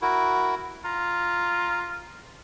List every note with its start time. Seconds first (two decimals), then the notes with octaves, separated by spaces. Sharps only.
0.02 E4 F#4 A#4
0.84 F4 A#5